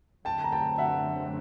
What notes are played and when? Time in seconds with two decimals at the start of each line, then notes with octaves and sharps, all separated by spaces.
0.25 F#2 D3 F#3 A3 C4 G5 A5
0.44 A#5
0.52 G5 A5
0.78 E5 F#5